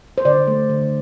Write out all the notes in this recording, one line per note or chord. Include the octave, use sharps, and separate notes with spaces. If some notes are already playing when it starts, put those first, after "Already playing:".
C5
D3 D5
A3
D3